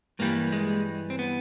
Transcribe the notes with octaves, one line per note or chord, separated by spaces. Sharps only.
G2 E3 G3 A#3
G#3
C4
B3